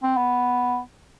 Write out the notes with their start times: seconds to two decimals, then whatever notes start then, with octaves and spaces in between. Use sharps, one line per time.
0.03 C4
0.17 B3